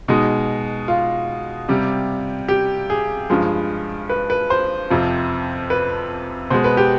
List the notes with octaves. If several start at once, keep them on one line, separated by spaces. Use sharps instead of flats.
B2 G#3 D#4
F4
C3 G3
G4
G#4
G2 F3 G#3
B4
B4
C5
F2 C3 F3
B4
B2 G#3 C5
B4
G4